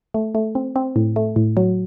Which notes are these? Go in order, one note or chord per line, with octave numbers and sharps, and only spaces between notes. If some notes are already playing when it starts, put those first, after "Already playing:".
A3
A3
C4
C4
A2
A3
A2
F#3